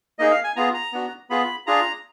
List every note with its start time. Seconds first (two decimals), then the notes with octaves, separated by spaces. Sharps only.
0.19 A#3 D#4 G#4 D#5
0.31 F5
0.44 G#5
0.56 B3 F4 G#4 A#5
0.74 A#5
0.93 B3 D4 F#4
1.30 B3 F4 G#4 B5
1.67 D4 F4 G#4 A#5